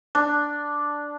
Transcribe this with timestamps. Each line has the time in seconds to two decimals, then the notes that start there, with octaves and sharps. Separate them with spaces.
0.15 D4